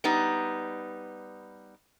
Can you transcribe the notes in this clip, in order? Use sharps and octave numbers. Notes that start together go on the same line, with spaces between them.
G3 B3 D#4